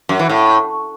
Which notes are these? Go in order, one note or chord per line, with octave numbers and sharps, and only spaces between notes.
F#2
E3
A2